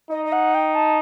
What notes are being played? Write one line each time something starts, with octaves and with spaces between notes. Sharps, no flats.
D#4 D#5
D#5
F#5
G5
A5